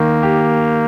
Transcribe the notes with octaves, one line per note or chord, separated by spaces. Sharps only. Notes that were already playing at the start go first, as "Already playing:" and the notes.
Already playing: D#3 A#3
G4